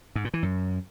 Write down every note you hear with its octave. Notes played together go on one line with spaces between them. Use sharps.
G#2
A#2
E3
F#2